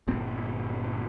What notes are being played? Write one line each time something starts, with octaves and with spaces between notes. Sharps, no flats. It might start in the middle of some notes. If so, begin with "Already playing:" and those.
G1 A#2 C4